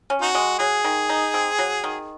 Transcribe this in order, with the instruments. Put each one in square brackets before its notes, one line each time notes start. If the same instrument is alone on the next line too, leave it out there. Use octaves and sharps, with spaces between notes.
[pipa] C#4
[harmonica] D#4 F#4
[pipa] G#3
[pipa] F#3 [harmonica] G#4
[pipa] D#3
D#4
C4
F#3
D#3